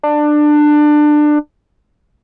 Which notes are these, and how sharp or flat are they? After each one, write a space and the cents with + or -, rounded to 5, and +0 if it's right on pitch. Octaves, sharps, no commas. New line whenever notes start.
D4 +20